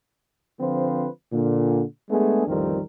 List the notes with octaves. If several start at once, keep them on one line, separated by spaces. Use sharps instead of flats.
D3 F3 C4 F4 B4 C5
A#2 D3
G#3 A3 B3 D4 G#4 A4
A1 F2 D#3 G3 C4 A#4